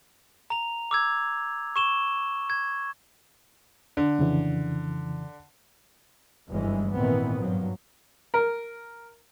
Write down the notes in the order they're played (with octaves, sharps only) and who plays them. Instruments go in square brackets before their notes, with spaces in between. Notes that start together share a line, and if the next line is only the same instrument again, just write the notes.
[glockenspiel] A#5 F7
D6 E6 G#6
C#6 E7 G7
G#6
[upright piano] D3
[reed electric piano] F2 C#3 E3
[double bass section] G1 F#2 E3 G3 G#3
G#1 A#2 D#3 E3 B3 C4
G2 F3 F#3
[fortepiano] A#4